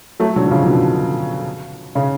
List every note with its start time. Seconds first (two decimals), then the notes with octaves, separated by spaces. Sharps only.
0.20 F#3 A3
0.36 D3 F#3
0.47 F#3
0.51 C#3 F3
0.66 B2 D3
1.95 C#3